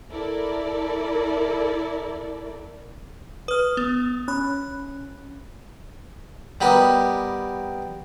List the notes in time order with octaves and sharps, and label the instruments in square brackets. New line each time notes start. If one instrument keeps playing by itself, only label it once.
[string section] E4 A4 A#4 D5
[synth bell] B4 F6 [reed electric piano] D#6
[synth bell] B3
[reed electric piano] C#4 [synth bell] B5 F#6
[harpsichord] G3 B3 G4 A#4 D#5